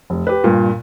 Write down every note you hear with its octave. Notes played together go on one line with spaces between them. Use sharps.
F1
G4 B4
G2 A#2